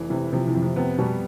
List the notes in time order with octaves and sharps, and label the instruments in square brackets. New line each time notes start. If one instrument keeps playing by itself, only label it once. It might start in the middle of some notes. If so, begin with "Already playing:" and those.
Already playing: [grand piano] F1 E3
[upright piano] C3 [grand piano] E3
[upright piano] C3 [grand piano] F3
[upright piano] C3 E3
[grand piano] F2
[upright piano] C3
[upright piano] C3 [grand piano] B3
[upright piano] B2 [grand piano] G3